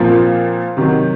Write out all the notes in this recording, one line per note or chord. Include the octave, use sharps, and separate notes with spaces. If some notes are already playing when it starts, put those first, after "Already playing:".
Already playing: A#2 F3 C4 F4 A#4
C3 D#3 F#3